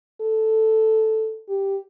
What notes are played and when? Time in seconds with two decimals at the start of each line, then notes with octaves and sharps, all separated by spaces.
0.21 A4
1.49 G4